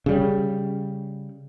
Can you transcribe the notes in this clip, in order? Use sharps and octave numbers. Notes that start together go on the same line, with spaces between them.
C#3 G3